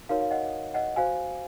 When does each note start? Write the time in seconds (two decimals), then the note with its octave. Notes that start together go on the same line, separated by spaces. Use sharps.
0.09 D#4 F#4 A#4 C#5 F5
0.21 F5
0.31 D#5 F#5
0.74 D#5 F#5
0.96 F#4 C5 F5 G#5